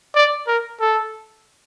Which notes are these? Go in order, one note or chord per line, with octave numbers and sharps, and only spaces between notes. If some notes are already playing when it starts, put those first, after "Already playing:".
D5
A#4
A4